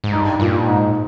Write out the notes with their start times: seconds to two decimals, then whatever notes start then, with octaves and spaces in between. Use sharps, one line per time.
0.04 G#2
0.12 G2 D#4
0.39 G2 A#2
0.67 G#2 D#4